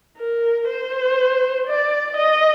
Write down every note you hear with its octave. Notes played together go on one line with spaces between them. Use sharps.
A#4
C5
D5
D#5